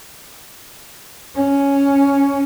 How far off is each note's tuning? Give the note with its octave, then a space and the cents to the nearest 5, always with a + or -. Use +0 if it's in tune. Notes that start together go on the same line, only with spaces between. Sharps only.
C#4 +5